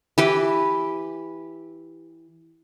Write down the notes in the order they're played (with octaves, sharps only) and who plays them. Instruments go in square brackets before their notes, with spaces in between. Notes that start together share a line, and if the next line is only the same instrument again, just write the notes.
[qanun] E3 G4 B4